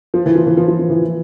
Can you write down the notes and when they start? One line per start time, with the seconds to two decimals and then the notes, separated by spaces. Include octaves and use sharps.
0.14 F3
0.26 E3
0.35 F3
0.47 E3
0.57 F3
0.68 F3
0.79 F3
0.90 E3